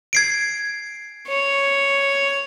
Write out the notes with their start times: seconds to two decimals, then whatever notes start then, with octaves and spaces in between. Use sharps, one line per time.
0.13 G#6 C7 D7
1.27 C#5